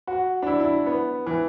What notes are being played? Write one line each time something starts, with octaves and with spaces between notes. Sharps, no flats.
F#4
D4
E4
E4
B3
E3